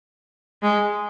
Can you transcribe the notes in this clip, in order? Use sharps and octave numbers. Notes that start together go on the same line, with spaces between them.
G#3